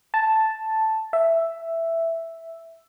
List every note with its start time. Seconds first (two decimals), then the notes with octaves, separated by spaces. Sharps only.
0.14 A5
1.13 E5